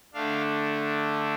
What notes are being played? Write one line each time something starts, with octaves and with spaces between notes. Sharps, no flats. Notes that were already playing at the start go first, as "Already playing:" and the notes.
D3 A3 D4 F5